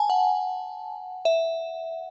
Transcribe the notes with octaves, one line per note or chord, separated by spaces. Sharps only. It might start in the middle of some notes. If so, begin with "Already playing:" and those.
Already playing: G#5 A5
F#5
E5